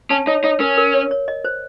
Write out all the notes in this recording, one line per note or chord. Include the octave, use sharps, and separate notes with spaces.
C#4 A5
D#4 C#5
D#4 C#5
C#4 A#4
A#4
C#5
C#5
D#5
C5